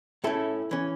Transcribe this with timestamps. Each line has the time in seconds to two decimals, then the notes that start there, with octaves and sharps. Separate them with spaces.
0.24 A2 A3 C#4 E4 A4
0.71 E3 C#4